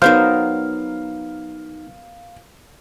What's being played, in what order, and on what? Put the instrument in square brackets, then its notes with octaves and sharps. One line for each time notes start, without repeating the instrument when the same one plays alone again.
[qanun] F#3 B3 A#4 [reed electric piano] D#4 F6 [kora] C5 [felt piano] F5